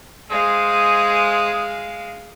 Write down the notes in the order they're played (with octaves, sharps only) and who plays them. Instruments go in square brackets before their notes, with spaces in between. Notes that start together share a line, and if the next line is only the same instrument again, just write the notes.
[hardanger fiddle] G#3 F5 [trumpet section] G#4 C5 D#6